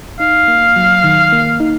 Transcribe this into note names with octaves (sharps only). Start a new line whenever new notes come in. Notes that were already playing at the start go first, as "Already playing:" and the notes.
D#4 F5
A#3
F#3
D#3
A#3
D#4